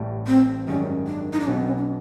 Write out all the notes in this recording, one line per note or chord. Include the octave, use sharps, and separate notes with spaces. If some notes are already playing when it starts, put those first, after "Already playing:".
Already playing: A1 A2 E3 G3
C4
G#1 F#2 D#3 G3 C#4
D4
D#4
D4
B1 B2 F#3 B3 C#4 D#4
C4
C#4
D4